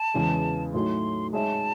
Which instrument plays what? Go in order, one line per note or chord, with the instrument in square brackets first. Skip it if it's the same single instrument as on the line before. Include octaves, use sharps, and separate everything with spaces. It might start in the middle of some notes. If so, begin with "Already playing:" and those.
Already playing: [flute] A5
[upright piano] E2 C#3 E3 G#3
[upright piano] A2 F#3 A3 D#4 [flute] C6
[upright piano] G#3 D#4 G#4 C#5 E5 [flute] A5